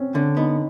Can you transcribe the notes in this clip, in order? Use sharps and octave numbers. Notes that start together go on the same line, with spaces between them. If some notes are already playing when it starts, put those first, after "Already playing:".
Already playing: C4 C#4
D3 C#4
B3 D#4